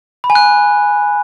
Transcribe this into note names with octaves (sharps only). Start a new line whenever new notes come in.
B5
G#5
F#6